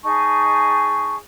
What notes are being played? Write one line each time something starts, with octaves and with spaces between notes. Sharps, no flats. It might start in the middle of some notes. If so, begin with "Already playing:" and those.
D#4 G#4 A5 C#6